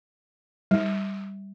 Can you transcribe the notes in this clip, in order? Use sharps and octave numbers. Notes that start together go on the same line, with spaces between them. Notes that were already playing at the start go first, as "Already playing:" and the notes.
G3